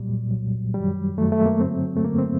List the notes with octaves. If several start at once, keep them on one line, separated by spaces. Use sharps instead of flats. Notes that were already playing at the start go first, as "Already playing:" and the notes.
Already playing: C2 A#2 F#3 G3
C2 A#2 F#3
F#2 D#3 F#3 G3
F#2 D#3 F#3 A3
A3
A#3
G2 D3 F#3 C4
A3
G2 D3 F#3 A#3
C4